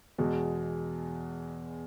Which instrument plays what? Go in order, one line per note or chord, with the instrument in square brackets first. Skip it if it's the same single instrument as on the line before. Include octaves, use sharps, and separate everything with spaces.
[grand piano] E2 B2 G#3